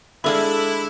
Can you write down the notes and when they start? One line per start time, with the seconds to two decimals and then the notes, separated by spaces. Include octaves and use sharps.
0.24 G#3 D4 E4 A4 E5 F5 G#5 B5